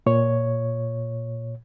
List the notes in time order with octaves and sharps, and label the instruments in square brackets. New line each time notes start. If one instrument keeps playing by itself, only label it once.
[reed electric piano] A#2 C#5